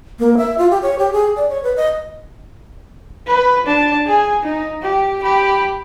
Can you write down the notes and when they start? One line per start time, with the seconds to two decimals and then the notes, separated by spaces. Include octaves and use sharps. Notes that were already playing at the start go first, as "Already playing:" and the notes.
0.19 A#3
0.37 E5
0.58 F4
0.71 G4
0.82 C#5
0.99 G4
1.13 G#4
1.36 D5
1.49 C#5
1.64 B4
1.76 D#5
3.27 B4
3.66 D4 A5
4.06 G#4 G#5
4.43 D#4
4.82 G4
5.22 G4 B5